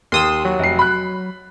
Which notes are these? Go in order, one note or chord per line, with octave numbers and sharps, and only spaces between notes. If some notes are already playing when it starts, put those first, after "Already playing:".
D#2 C6 D#6 E6
F#3
F1 C7
B5 F#6